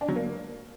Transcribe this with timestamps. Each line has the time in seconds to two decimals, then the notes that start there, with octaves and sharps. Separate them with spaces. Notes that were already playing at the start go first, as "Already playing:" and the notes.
0.01 D4
0.08 F#3
0.16 A#3